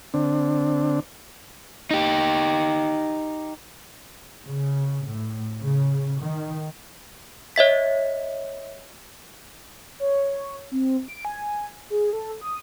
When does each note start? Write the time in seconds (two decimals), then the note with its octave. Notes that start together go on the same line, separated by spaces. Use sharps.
0.14 D3 C4 D4
1.91 D#4 G4
4.45 C#3
5.07 A2
5.61 C#3
6.20 D#3
7.56 C#5 D#5 E5 B6
10.00 C#5
10.72 C4
11.08 D7
11.25 G#5
11.90 G#4
12.13 A4
12.41 D#6